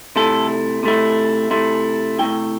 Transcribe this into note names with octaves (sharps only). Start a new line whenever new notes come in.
C3 A3 E4 A4
C3 A3 E4
C3 A3 E4
C3 A3 E4 G5